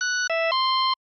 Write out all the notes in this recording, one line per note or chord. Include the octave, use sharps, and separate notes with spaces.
F#6
E5
C6